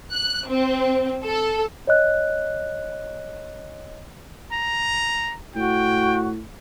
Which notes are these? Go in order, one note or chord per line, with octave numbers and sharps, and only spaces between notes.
F#6
C4
A4
C#5 D#5 F#6
A#5
A2 F#4 G5